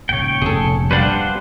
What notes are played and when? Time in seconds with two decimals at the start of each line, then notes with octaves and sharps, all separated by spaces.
0.09 A#1 G#2 C#3 C#5 G5
0.42 F1 G#4 A4
0.91 G3 D4 B4 C5 F5 F#5